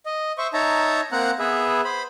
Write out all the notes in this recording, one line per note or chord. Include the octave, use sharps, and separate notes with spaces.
D#5
C5 E5 C#6
D#4 C#5 E5 A5 A#5
A#3 C4 F#5 A#5 F#6
B3 G#4 B4 E5
C5 B5